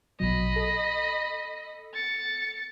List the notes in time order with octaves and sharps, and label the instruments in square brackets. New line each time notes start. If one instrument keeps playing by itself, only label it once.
[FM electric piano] A#1 B2 F#3 [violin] D#5 B5
[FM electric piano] A4
[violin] A6 C#7